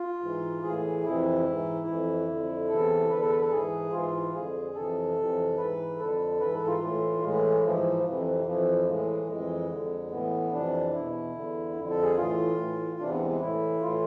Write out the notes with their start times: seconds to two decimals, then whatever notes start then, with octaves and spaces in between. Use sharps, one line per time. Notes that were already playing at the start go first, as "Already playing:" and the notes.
Already playing: F4
0.21 G#2 E3
0.63 A2 E3 G#4
1.04 F2 C3 E3 E4
1.46 G#2 E3
1.87 F2 E3
2.28 F2 D3
2.69 E2 C3 E3 A4
3.10 E2 D3 B4
3.20 A4
3.31 B4
3.41 A4
3.51 G#2 E3 G#4
3.93 G#2 E3 F4
4.33 F2 D3 G#4
4.75 F2 C3 E3 A4
5.16 F2 C3 E3
5.57 G#2 E3 B4
5.99 F2 D3 A4
6.40 G#2 E3 B4
6.53 A4
6.67 F4
6.81 A2 E3
7.22 A2 E3 G#3
7.63 G#2 E3 F3
8.05 F2 C3 E3
8.46 F2 E3 F3
8.87 A2 E3 G#3
9.29 F2 E3 G#3
9.70 F2 D3
10.11 A2 E3 B3
10.52 F2 C3 E3 D4
10.93 E2 B2 E4
11.35 E2 D3
11.76 F2 D3
11.90 A4
12.03 G#4
12.17 A2 E3 F4
12.58 A2 E3
13.00 E2 C3 E3 D4
13.10 B3
13.20 G#3
13.30 G#3
13.41 A2 E3 E4
13.81 A2 E3 F4